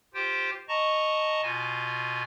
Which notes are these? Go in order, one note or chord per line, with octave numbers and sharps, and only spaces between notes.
F4 G4 C5 G5
D#5 A5 A#5 C#6
B2 F4 G#5